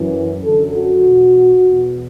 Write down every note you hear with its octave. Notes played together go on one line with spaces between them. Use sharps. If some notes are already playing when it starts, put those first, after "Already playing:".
Already playing: F#2 E3
F#2 D3 A4
F#4
E2 B2
E2 B2